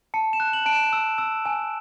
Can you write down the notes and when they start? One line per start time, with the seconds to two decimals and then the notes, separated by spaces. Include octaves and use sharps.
0.14 A5 C#7
0.33 E7
0.40 F#6
0.53 F#7
0.66 A5 D7
0.73 E7
0.93 E6
1.18 E6
1.46 G#5